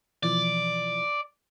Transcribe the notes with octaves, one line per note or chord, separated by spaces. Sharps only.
B2 E3 F3 D5